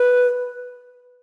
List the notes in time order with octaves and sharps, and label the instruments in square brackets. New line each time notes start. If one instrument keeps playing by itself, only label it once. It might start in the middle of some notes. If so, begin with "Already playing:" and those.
Already playing: [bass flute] B4